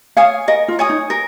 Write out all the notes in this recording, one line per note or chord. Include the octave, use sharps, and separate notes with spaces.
C#5 F5 G#5 D#6
A#4 D#5
F4
C#5 G#5 D#6
D#4
A#4